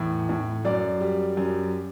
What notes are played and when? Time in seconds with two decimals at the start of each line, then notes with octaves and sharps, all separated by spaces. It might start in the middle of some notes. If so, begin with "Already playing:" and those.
Already playing: E2 A2
0.29 A2
0.65 F#2 D5
1.01 G3
1.37 F#2